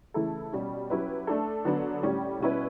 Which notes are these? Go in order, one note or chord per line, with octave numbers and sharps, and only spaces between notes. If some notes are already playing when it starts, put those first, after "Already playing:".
C#3 E3 A3 E4 A4
B2 G3 C#4
F#3 C#4 E4 G4 B4
A3 D4 A4
D3 F#3 B3 D4
A2 G3 C#4 G4
B2 G3 C#4 E4 B4